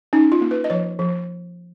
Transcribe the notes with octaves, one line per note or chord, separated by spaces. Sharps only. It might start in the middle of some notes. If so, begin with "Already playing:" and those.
C#4 D#4
F4
A#3
B4
D#5
F3 C#5
F3